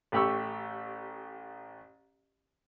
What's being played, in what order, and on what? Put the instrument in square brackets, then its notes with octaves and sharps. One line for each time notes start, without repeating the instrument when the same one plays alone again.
[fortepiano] A1 A3 G4 B5 C#6 E6